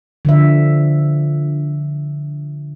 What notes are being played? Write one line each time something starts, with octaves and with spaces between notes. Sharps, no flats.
D3 F3 E5